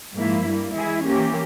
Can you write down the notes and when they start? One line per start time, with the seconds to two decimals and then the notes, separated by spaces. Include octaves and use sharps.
0.17 G#2 F3 A#3 E4
0.46 G2 G3 A#3
0.76 E3 G#3 E4 G#4
1.06 E3 A#3 C#4 G4